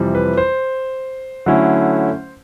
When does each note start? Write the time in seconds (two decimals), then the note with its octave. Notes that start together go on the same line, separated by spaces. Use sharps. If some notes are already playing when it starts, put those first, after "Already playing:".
Already playing: F2 C3 E3 G3 C4
0.15 B4
0.37 C5
1.46 D3 F#3 A3 C#4 E4